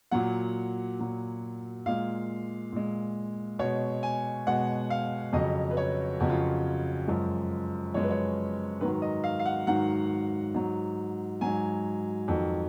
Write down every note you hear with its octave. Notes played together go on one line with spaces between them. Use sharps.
A#2 F#3 F#5
A#2 F#3
A#2 G#3 F5
A#2 G#3
B2 G#3 C#5
G#5
B2 G#3 F#5
F5
F2 C#3 F#3 D#5
B4
C#5
F2 C#3 F#3 F#4
F4
F#4
F#2 F3 G#3
F#2 F3 G#3 C#5
B4
C#5
G#2 D#3 F#3 B4
D#5
F5
F5
F#5
G#2 D#3 F#3 F#5
G#2 F#3
G#2 F#3 G#5
F2 D#3 F#3